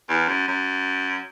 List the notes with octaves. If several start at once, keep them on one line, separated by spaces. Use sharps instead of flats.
E2
F#2
F#2